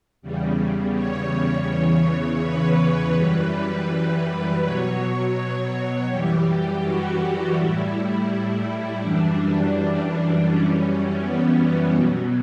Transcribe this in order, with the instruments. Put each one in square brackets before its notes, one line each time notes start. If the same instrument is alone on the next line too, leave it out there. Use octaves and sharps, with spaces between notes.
[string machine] E2 C#3 G3
C#5
E2 C#3 E3
B4
F#2 E3 G3 B4
B2 F#3 C#5
C#5
F#2 E3 G3 G4
F#4
A2 G3 E4
F#2 E3 G3 D4
F#2 E3 G3 C#4
B3
B2 F#3